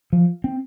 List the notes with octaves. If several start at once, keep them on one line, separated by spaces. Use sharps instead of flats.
F3
C4